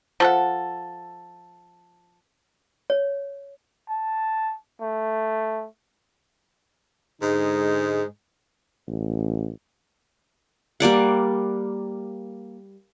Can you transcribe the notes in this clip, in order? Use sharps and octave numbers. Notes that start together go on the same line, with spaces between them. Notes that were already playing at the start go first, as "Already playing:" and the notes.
F3 A4 F#5
C#5
A5
A3
G#2 D3 G#3 D#4
A1
G3 A#3 D5 F#5